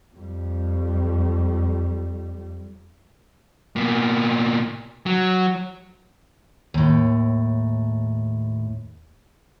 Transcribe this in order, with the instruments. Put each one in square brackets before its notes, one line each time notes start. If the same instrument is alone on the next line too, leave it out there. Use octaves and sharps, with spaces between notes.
[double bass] F2 G3
[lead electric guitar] B2 A#3
F#3
[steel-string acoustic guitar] D#2 A2